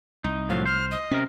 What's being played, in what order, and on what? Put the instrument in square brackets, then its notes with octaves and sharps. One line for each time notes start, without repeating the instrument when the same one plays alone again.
[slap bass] C2 [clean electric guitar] D#4
[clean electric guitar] A2 F3 F#3 [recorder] F5
[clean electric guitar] C5 [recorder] F6
[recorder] D#5
[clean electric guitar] C3 A#4 [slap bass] C#4